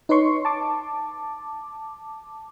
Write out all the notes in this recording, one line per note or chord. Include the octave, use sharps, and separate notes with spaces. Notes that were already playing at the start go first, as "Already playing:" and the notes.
D#4 B4 C#5 C6 C#6
A5 D6